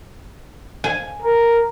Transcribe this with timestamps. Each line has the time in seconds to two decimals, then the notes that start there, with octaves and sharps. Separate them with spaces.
0.84 G#5
1.22 A#4